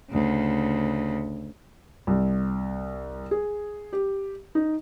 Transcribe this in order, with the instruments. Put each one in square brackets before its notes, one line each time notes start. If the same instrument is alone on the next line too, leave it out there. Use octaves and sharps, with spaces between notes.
[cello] D2 C#3
[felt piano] C2
G#4
G4
D#4